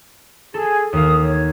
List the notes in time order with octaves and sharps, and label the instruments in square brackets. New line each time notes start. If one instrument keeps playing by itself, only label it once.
[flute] G#4 [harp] A4
[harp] D#2 F5 [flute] D#6
[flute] C#5